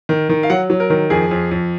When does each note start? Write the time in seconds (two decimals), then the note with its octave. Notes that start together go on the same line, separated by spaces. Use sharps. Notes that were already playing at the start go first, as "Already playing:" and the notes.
0.09 D#3
0.29 D#3
0.43 F5
0.50 F#3 F#5
0.70 F#3
0.80 A#4
0.90 D#3
1.10 F2 G#4
1.31 F2
1.51 F2